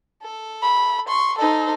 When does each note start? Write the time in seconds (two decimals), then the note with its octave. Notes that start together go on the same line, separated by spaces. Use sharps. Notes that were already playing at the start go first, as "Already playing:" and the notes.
0.22 A4
0.62 B5
1.08 C6 C#6
1.39 D#4 A4 C5